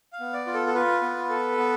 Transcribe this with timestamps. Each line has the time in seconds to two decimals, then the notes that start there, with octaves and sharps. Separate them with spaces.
0.13 F5
0.20 B3
0.33 D5
0.47 F4
0.54 A4
0.67 A4
0.74 F4 B4
1.02 B3
1.29 A4
1.57 B3